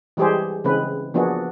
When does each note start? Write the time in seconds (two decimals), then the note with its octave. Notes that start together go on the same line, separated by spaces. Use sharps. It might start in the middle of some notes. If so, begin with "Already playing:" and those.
0.17 E3 G3 G#3 G4 G#4 C5
0.64 C#3 E3 G#3 C4 B4
1.14 F3 A#3 B3 D4 F#4 G#4